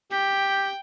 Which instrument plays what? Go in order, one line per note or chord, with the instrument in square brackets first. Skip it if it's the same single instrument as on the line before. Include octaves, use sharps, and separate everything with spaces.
[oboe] G4 [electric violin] G5